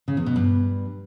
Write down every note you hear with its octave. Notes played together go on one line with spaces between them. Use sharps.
C#3
E2
B2
G2